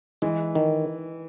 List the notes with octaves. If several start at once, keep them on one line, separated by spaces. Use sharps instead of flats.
E3 G#3
D#3